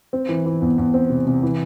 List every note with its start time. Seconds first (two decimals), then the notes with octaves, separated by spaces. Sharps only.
0.13 C4
0.29 E3
0.46 E3
0.62 E2
0.78 E2
0.94 C4
1.10 C3
1.27 C3
1.43 E3